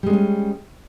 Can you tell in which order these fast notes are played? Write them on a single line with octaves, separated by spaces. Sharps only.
G3 G#3 D4 C#4